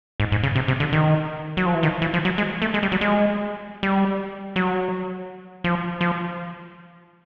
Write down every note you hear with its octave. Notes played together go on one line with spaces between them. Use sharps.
G#2
G#2
C#3
C3
C3
D3
D#3
F#3
F3
E3
D#3
E3
F3
F#3
G#3
A3
G#3
G3
F#3
G#3
G3
F#3
F3
F3